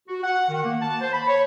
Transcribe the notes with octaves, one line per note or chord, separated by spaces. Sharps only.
F#4
F#5
D#3
A#3
A5
C5
B5
C#5